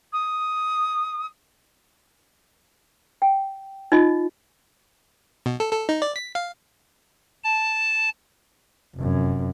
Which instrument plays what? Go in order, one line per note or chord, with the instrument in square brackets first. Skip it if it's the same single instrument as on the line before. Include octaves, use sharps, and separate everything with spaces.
[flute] D#6
[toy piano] G5
D#4 F4 D#5
[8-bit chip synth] B2
A4
A4
D#4
D5
B6
F5
[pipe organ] A5
[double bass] F1 F#2